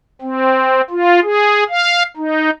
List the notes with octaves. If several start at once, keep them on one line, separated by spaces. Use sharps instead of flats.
C4
F4
G#4
F5
D#4